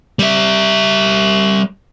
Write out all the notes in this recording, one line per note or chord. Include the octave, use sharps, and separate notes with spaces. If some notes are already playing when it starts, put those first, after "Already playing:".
G3 E5